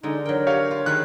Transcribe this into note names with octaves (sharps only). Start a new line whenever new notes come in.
D3 G#3 D#4
F#3 A#4 G5
G4 C#5 F5
F4
D#3 G#4 B4 E5 F#6